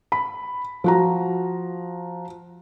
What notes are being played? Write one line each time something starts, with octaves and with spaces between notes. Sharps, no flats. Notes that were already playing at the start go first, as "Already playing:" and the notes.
B5
F3 F#4 A#5